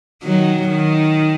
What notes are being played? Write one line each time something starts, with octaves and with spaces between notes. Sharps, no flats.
D#3 F#3
D#3